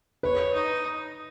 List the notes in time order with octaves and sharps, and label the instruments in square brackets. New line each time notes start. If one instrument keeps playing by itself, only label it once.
[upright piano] B4 [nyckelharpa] C#5
[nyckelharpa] D#4